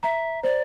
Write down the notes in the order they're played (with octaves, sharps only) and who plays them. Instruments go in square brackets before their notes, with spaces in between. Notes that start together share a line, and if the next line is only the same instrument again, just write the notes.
[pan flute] E5 [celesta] A#5
[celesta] C5 [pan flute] D5